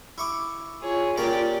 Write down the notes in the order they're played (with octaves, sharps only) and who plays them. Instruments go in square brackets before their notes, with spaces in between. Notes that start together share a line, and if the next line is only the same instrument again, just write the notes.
[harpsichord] E4 C#6 D6
[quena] F4 [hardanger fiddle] G#4 C#5
[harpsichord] A#2 C#4 A#5 [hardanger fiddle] G4 D5